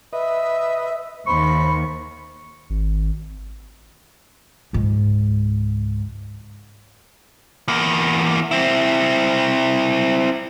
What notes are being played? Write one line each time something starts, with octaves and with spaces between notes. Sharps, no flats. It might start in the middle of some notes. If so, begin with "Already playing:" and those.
B4 D#5 E5
D#2 C5 B5 C#6
G#1
C#2 G#2
E2 A#3
C4 E4